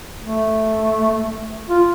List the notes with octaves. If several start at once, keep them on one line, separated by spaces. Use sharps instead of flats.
A3
F4